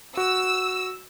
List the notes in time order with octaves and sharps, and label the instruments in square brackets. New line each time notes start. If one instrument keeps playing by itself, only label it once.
[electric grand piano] F#4 [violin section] E6